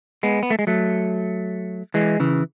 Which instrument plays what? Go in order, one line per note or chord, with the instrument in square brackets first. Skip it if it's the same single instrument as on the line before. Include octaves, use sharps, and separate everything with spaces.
[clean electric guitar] G#3 B3
B3
A3
G#3
F#3 A3
E3 G#3
C#3 E3